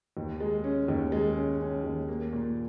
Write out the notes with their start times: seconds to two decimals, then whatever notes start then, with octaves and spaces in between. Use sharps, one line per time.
0.17 D#2
0.41 G#3
0.64 C#4
0.88 D#2
1.12 G#3
1.36 C#4
1.60 C#4
1.84 D#2
2.09 A#3
2.33 A#2